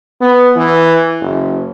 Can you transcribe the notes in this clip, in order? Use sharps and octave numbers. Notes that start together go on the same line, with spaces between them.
B3
E3
F#1